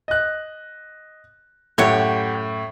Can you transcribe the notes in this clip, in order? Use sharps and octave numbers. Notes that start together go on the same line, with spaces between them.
D#5 F#6
F#2 A2 G4 C#5 F#5